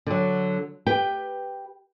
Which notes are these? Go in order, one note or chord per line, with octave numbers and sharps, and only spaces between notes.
D3 F#3
G4 B4 G5